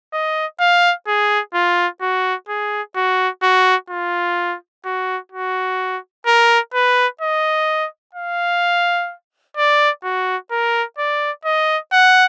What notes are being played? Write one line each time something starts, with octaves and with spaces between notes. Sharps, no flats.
D#5
F5
G#4
F4
F#4
G#4
F#4
F#4
F4
F#4
F#4
A#4
B4
D#5
F5
D5
F#4
A#4
D5
D#5
F#5